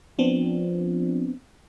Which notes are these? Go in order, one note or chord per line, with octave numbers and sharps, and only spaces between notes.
F3 B3 C4 D4